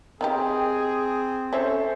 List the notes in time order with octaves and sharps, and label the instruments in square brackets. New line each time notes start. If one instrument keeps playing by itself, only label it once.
[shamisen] D#3 D#4 G4 [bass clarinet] C4 [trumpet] G#4
[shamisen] C#4 [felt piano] A4 C5 E5